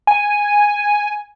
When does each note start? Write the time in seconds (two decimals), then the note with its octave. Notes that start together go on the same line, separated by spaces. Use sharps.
0.07 G#5